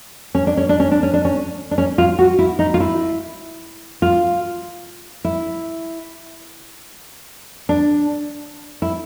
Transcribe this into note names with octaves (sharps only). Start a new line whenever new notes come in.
C#4
D4
C#4
D4
C#4
D4
C#4
D4
C#4
D4
C#4
F4
F#4
E4
D#4
F4
E4
F4
E4
D4
E4